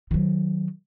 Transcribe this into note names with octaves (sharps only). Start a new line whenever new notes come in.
D#3 F#3